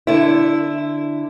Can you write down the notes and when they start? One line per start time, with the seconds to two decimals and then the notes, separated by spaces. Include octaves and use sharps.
0.07 D3 E4